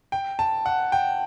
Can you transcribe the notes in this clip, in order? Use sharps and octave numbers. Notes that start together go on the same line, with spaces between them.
G5
A5
F#5
G5